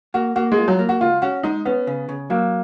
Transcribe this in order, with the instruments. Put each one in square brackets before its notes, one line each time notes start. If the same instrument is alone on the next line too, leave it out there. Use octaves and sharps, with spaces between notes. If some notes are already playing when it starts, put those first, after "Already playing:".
[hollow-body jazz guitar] A#3 [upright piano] F#4
[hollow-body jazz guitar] A#3 [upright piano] F#4
[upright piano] G#3
[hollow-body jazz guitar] F4
[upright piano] F#3
[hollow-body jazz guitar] A#3
[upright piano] F#4
[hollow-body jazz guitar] C#2 [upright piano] F4
[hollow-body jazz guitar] C#4 [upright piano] F#4
[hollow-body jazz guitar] G#3 [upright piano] D#4
[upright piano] B3 [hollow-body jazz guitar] C#4
[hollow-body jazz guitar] C#3
C#3
[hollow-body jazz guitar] F#3 [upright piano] A#3